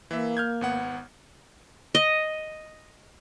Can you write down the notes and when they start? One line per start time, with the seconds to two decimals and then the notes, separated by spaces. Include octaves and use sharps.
0.11 E3 A#3 E5
0.37 F6 G6 G#6
0.61 G#1 B3 F#5
1.95 D#5